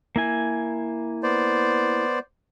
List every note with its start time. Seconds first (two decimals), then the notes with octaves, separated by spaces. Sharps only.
0.16 A#3 E4 G#5
1.23 B3 C5 D5